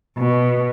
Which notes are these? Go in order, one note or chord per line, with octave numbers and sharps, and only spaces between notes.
B2